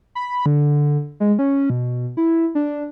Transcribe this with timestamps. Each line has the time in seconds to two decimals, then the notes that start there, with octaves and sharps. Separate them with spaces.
0.15 B5
0.46 D3
1.20 G#3
1.39 C#4
1.70 B2
2.17 E4
2.55 D4